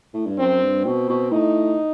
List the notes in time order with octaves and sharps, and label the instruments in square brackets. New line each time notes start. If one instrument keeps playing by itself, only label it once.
[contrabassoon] A2
G2
[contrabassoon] F#2 [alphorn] C4
[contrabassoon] G2
[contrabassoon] B2 [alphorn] C4
[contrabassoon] B2
[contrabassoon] A2 [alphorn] D#4